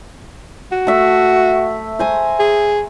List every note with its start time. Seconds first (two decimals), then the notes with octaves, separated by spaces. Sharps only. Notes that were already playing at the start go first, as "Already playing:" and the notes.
0.72 F#4
0.87 A3 E5
1.99 C5 G#5 A#5
2.39 G#4